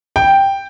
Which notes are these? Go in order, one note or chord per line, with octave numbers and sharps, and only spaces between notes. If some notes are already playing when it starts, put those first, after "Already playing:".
G5